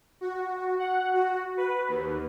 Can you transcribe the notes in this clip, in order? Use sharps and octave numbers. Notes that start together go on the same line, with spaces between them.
F#4
F#5
F#4
B4
D#2